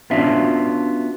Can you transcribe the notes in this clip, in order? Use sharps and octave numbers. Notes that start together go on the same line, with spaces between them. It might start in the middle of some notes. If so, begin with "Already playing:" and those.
B3 C#4 D4 F4 F#4 E5